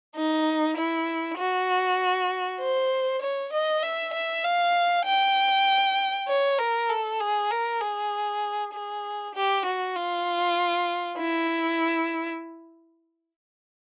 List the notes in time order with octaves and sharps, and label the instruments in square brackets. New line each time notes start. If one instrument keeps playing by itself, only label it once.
[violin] D#4
E4
F#4
C5
C#5
D#5
E5
E5
F5
G5
C#5
A#4
A4
G#4
A#4
G#4
G#4
G4
F#4
F4
E4